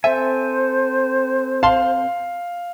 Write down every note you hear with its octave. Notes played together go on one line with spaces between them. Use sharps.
C4 A4 C5 E5 G#5
F5 A5 C6